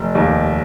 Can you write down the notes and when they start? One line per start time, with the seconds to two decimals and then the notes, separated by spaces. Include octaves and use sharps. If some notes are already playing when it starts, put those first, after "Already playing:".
Already playing: F1
0.15 D#2